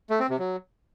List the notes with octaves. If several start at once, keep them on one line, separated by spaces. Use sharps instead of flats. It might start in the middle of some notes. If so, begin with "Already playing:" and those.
A3
C4
C3
F#3